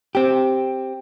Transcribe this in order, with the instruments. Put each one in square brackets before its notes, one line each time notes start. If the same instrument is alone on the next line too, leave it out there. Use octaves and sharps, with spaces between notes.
[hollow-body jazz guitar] C4 G4